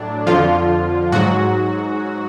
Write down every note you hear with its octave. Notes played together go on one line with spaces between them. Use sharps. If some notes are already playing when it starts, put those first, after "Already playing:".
Already playing: A2 F#3 D4
F2 D3 F3 F4
G#2 F#3 F#4